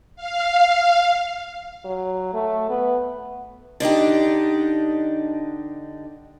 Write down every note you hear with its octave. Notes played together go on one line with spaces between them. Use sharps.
F5
F#3
A3
B3
D3 D4 D#4 G4